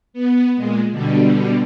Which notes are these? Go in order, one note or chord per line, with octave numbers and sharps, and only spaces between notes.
B3
A#2 G#3
B2 D3 G3